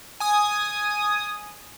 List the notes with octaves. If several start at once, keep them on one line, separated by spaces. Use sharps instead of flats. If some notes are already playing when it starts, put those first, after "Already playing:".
G#5 D#6